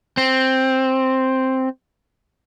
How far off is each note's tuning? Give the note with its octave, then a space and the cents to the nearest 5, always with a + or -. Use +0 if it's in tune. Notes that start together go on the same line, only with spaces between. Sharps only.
C4 +5